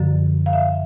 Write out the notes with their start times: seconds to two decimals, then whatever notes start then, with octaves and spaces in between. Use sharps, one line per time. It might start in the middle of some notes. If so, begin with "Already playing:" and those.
Already playing: F#2 D3 F3
0.46 F5
0.53 E5